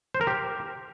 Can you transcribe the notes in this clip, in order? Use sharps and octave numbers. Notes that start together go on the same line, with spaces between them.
C5
A#4
G4